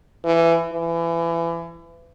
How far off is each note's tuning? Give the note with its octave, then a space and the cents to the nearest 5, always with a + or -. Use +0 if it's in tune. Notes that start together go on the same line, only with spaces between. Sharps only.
E3 +20
E3 +30